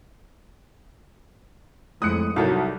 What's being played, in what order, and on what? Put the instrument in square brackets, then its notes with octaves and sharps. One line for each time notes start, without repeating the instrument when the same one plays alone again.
[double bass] F2 [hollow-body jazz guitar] A2 G#3 [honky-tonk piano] D#6 F#6 C#7
[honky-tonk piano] C2 F#3 A#4 [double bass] G3 [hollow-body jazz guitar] D#4 A4 C#5